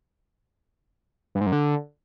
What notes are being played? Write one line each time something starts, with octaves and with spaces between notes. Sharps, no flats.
G2
G#2
F#2
D3